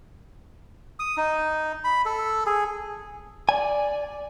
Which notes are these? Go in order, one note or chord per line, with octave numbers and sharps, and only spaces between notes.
D#6
D#4
B5
A4
G#4
D5 G#5